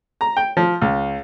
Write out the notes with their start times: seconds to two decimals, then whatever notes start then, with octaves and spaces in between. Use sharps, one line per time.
0.21 A#5
0.37 G5
0.57 F3
0.82 C#2